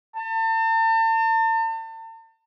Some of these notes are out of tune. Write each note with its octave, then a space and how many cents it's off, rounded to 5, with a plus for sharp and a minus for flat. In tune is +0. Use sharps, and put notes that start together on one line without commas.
A5 +40